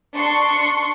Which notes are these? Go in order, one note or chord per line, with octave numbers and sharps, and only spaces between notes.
D4 C6 C#6 C#7